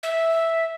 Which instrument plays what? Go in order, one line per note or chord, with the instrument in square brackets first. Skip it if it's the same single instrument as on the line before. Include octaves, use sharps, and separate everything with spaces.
[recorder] E5